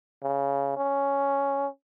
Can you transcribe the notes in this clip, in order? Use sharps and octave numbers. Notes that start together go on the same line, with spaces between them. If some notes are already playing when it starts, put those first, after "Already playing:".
C#3
C#4